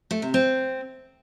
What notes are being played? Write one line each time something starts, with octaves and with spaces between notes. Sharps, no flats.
A3
C3
C4